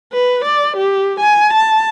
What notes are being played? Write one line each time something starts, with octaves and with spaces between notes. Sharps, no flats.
B4
D5
G4
G#5
A5